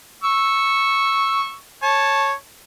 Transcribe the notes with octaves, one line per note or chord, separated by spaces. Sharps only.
C#6 E6
C#5 A5